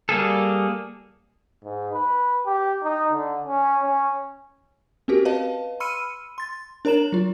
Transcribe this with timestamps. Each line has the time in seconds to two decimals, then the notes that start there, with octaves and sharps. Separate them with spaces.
0.09 G3 A#3 G#4 A4
1.64 G#2
1.93 B4
2.46 G4
2.83 D#4
3.12 D3
3.47 C#4
3.82 C#4
5.08 C4 C#4 F#4 G4 A#4
5.25 B4 D#5 F5 A5
5.80 B5 C6 E6 F6 C#7 D#7
6.38 C6 A6
6.85 D4 A#4 C#5 A#5 E7 F#7
7.12 F#3 F4